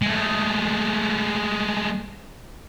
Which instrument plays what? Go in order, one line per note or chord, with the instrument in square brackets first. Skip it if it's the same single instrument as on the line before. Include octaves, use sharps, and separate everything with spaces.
[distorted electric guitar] G#3 A3